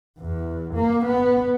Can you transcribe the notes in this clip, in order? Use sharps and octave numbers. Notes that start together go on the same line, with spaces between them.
E2
A#3
B3